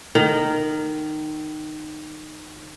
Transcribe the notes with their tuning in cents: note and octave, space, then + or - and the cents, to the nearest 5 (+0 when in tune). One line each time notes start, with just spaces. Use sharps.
D#3 -15